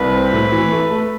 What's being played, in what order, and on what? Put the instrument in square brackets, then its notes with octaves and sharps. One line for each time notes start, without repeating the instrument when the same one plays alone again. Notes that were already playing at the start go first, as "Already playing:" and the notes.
Already playing: [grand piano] C2 [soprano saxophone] B4
[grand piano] C4
A2
E3
A3
A3